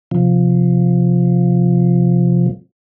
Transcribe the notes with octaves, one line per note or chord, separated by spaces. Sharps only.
C3 F3